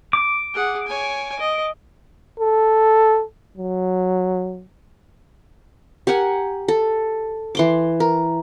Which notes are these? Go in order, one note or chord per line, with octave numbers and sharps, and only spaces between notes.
D6
G#4 F#5
C#5 G#5
D#5
A4
F#3
G4 A#4 F#5 G#5
A4
E3 C6 D6
A#4